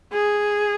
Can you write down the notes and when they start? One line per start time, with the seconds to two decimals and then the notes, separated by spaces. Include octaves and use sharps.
0.13 G#4